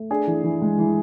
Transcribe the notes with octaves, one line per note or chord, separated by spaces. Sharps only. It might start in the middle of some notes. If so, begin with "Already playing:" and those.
Already playing: A3
D4 G#4
E3
E3
G#3
E3